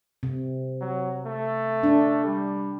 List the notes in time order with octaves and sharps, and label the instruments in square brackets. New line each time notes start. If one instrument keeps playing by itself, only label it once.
[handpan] C3
[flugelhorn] F#3
A3
[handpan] D4
[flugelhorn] G3